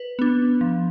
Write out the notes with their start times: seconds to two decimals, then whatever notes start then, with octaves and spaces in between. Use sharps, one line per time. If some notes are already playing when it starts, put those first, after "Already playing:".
Already playing: B4
0.19 B3 D4
0.61 F3